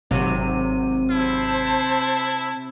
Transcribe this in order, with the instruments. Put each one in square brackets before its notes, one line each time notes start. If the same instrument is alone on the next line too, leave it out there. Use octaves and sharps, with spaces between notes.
[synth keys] G#1 F#3 D#7 [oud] C3
[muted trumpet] E4 [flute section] C5 A5